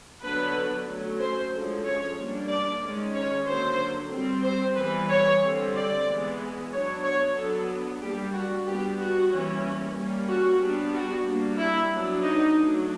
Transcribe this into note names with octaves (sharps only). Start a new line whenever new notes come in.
D3 F#3 B3 D4 B4
F#3 A3 C#4
C5
D3 F3 G#3 C#4
C#5
G3 A#3 D4
D5
D#3 G#3 C#4
C#5
D3 F#3 A#3 C5
G3 C4
C5
E3 G3 B3 B4
C#5
D3 G3 C4
D5
E3 G#3 B3
F#3 B3 D4 C#5
C#5
F#3 B3 D4 A4
G3 A#3 D4 G4
F#4
G3 B3 D4 G4
F#4
E3 G3 A#3 C#4
G3 A#3 C#4
F#4
G3 B3 D4
F#4
G3 A#3 D4
E4
F#3 B3 D4
D#4
F#3 A3 D4